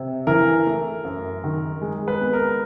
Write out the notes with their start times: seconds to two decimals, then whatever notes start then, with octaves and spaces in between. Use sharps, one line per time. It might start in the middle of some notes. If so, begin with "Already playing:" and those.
Already playing: C3
0.27 E3 A#4
0.67 A3
1.05 F#2
1.44 D#3
1.82 G#3
2.08 B4
2.21 B3
2.33 A#4